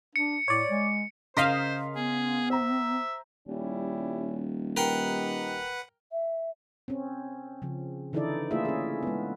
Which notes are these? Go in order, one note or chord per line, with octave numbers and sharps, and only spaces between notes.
D4 C#7
A2 C#5 D5
G#3
C#3 A#4 C5 D#5 F5 C6 B6
B3 G#4
C5 E5 A#5
D#1 G3 C#4 E4
D#4 G4 A#4 B4 F#5 G5
E5
C4 C#4
C#3 F3
D3 E3 D#4 E4 A4 D5
A3 A#3 E4 F4 G#4 E5
C#4 G#4
G#3 B3